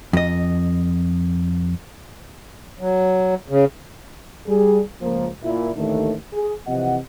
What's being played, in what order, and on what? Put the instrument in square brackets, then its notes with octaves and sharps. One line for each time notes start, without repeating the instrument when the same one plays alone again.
[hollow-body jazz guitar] F2 D#5
[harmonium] F#3
C#3
[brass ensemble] G3 G#4
C#2 F3 A#3
A#2 E4
A1 D#2 D3 D#3 A3
G#4
C3 E3 F3 D#5 F#5